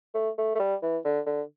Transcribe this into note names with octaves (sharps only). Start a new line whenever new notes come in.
A3
A3
A3
G3
E3
D3
D3